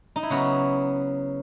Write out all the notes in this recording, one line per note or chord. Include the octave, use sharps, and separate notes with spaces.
D#4
E4
C#3 F#3 B3 F#4